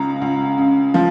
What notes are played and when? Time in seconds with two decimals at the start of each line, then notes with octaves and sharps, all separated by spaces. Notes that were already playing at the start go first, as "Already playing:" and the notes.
Already playing: C#2 C#3 A#5
0.21 C#2
0.58 C#3
0.94 F3